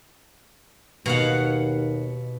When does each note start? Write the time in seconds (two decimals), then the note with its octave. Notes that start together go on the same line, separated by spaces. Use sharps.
1.06 D#2 B2 F5 F#5